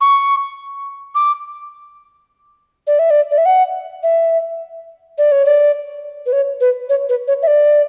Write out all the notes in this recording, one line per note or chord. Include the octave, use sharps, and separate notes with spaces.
C#6
D6
D5
E5
D5
D5
E5
F#5
E5
D5
C#5
D5
B4
C#5
B4
C#5
B4
C#5
E5
D5